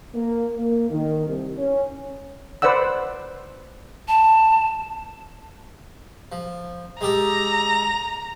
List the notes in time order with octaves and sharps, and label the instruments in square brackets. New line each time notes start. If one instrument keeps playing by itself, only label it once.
[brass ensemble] A#3
A#3
D#3
C2
C#4
[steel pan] B4 C5 D5 F#5 E6
[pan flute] A5
[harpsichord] F3
[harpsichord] G#3 G4 A4 [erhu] A#5